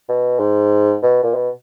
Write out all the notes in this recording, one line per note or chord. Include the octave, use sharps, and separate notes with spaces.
B2
G#2
B2
A#2
B2